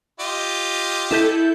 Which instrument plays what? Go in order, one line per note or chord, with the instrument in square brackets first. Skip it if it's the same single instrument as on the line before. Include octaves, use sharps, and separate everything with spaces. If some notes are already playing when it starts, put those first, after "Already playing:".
[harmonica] F4 G4 D#5
[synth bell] E4 A4 G6